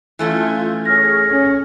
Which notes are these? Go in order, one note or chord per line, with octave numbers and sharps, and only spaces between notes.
E3 A3 C#4 F4 G6 G#6
G#4 C#5 F6 A#6
C#4